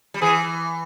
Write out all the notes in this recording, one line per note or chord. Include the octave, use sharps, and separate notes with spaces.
G3
E3 G#4